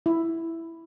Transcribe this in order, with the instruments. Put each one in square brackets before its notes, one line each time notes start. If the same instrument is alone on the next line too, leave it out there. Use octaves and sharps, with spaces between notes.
[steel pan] E4